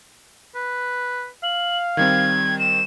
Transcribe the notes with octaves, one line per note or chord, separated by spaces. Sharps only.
B4
F5 F#7
D#3 G3 C4 G#6
E7